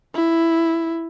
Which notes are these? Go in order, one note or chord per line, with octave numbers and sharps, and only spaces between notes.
E4